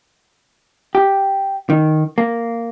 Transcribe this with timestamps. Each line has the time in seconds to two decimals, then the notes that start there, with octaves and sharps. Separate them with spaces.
0.95 G4
1.70 D#3
2.18 A#3